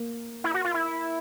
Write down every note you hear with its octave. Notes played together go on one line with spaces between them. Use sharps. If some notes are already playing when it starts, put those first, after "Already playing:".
Already playing: A#3
E4
F#4
F4
E4